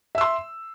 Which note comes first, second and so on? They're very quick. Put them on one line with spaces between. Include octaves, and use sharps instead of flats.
E5 E6 C6